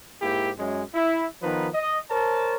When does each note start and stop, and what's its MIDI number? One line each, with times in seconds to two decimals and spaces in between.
0.22 0.50 44
0.22 0.50 58
0.22 0.50 64
0.22 0.50 67
0.58 0.81 42
0.58 0.81 56
0.94 1.25 64
1.42 1.68 51
1.42 1.68 53
1.42 1.68 59
1.42 1.68 63
1.42 1.68 71
1.73 1.98 75
2.10 2.56 70
2.10 2.56 72
2.10 2.56 73
2.10 2.56 81